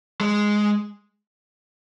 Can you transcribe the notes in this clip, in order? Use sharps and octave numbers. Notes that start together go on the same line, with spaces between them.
G#3